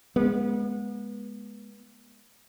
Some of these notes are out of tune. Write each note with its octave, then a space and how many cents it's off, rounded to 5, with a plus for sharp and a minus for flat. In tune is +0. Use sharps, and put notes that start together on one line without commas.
G#3 +0 B3 -30